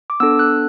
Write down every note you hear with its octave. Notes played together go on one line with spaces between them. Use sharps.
D6
B3 D4 A4 E6
F#6